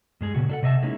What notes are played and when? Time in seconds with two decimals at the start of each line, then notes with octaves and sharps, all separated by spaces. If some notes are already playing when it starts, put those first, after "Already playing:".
0.21 G2 G#3 G#4
0.34 A#2 C#3 F#4
0.49 D4 A4 F#5
0.63 C3 D#5 E5 A5
0.82 G#3 A#3 C#4 D#4 E4